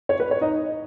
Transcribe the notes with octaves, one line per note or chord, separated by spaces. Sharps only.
C#5
B4
C#5
D#4 D#5